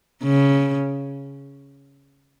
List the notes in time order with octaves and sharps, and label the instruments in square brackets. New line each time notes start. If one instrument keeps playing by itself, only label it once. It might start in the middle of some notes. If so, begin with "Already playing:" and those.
[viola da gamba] C#3